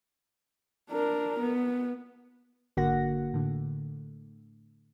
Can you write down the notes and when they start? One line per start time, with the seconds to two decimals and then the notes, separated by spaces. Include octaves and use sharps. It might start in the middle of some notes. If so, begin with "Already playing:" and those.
0.90 D4 A#4
1.40 B3
2.77 G#1 D3 A#3 F#4 F#5 A#6
3.34 A2 D3